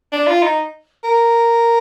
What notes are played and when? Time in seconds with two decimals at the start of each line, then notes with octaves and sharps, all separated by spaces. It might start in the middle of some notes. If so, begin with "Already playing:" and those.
0.12 D4
0.27 F4
0.42 D#4
1.04 A#4